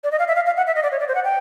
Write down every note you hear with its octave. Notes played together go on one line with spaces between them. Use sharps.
D5
D#5
F5
E5
F5
F5
F#5
E5
D#5
D5
C#5
D5
C5
F#5
G5